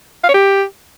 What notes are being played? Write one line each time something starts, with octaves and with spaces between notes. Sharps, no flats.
F5
C#5
G4